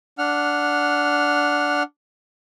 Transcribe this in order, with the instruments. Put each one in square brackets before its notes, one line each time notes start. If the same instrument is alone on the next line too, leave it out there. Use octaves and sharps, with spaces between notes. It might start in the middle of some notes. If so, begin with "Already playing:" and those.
[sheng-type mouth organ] D4 F#5 F6